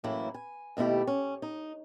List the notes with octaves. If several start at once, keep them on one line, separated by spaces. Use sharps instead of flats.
F#2 A2 E3 A3 A#3 E4
G#5
D#2 B2 A3 E4 G4
C#4
D#4